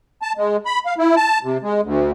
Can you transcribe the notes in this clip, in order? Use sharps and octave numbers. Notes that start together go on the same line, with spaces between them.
A5
G#3
B5
F5
E4
A5
C3
G#3
D2